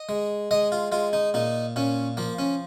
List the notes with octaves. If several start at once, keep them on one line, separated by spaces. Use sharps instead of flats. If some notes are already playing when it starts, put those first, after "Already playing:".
Already playing: D#5
G#3
G#3 D#5
F4
G#3 F4
D#4
A#2 D#4
A#2 C#4
F3 A#3
C#4